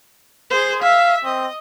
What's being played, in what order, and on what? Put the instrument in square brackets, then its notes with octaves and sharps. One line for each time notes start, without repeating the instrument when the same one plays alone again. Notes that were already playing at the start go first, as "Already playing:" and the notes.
[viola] G#4 C5
[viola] E5 [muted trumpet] F5
[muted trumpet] C4 [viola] D#5